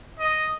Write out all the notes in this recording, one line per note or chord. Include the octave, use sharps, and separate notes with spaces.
D#5